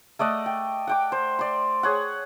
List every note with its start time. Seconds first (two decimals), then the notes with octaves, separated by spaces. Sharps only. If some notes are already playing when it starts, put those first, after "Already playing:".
0.19 A3 D5 D#5 F#5
0.46 G5
0.87 F#5 G5 D6
1.12 C5
1.39 D5 C6
1.83 G#4 C#5 F#5